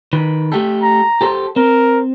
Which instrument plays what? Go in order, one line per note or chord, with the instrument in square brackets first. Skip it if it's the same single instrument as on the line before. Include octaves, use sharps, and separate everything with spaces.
[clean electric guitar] D#3 B4
A3 G4 A4
[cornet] A#5
[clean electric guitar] G4 A4 C5
[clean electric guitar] C4 [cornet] A#4